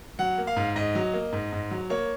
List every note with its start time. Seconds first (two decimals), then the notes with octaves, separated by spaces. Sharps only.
0.19 F#3 F#5
0.38 A#3
0.47 F5
0.56 G#2
0.76 G#2 D#5
0.95 F#3
1.13 A#3
1.32 G#2
1.52 G#2
1.71 F#3
1.90 A#3 C#5